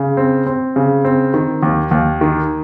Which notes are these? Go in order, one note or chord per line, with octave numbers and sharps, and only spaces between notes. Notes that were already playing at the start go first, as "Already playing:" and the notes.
Already playing: C#3
C4
C4
C#3
C4
D#3
D#2
D#2
D#3